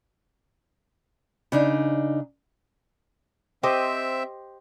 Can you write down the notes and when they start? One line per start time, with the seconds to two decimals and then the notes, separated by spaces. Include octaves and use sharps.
1.52 C#3 D4 D#4
3.63 C4 G4 C5 D#5 E5